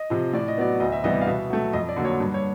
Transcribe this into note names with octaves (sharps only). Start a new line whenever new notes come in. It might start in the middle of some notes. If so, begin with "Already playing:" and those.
Already playing: D#5
C3 F3
A2 D5
D#5
F#3 B3 D5
D2 D#5
E5
C3 E3 G3 B3 D#5
F5
B2 E5
F#3 A3
F2 D#5
D5
D3 F#3 A#3
C#5
G2
C#5